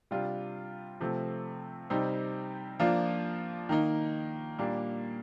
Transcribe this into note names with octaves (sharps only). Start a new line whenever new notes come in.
C3 G3 D4 F4
C3 F3 A3 C4
C3 G3 C4 D#4
F3 A#3 D4 F4
D#3 A#3 D#4
A#2 G3 A#3 D4